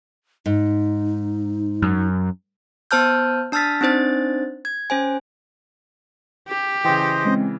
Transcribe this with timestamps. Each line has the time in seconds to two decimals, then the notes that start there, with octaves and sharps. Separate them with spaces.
0.46 G#2 D#4
1.82 F#2
2.91 B3 C5 A5 F6 G6
3.52 D4 A5 E6 F6 A6 B6
3.81 C4 D4 D#4 C5 A6
4.65 G#6
4.90 C#4 C5 G#5
6.48 G4
6.85 C#3 E3 C5 D#5 G5
7.25 G#3 C4 C#4